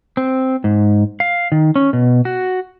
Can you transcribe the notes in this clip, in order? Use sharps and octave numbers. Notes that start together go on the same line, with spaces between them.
C4
G#2
F5
D#3
C#4
B2
F#4